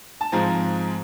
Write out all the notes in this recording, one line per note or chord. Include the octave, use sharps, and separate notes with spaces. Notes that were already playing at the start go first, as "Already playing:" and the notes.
A5
G#2 F3 G#3 C4 A#5